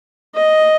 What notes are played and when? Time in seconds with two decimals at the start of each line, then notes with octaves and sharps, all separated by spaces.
0.35 D#5